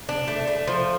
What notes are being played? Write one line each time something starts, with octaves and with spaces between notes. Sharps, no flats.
D4
A3
A3
F3